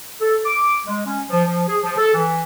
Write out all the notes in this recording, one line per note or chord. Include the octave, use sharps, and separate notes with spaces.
A4
D6
G#3
C#4
F3
F3
G#4
F3
A4
E3